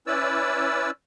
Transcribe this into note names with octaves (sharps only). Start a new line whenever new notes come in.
C#4 E4 B4 D5 E6